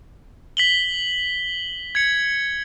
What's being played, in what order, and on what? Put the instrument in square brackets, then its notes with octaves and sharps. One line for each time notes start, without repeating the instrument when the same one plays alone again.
[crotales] B6 F#7 G7
G#6 C#7